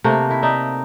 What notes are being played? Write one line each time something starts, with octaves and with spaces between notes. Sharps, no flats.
C3 A3 A#3
D#3 E4
D#4 D5 E5